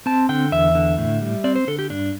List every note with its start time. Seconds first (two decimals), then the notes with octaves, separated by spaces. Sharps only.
0.06 C4 A5
0.29 D3 G5
0.52 E2 E5
0.75 D3
0.98 A2
1.22 G3
1.44 C4 D5
1.56 C5
1.67 D3 A4
1.79 G4
1.90 G2 D4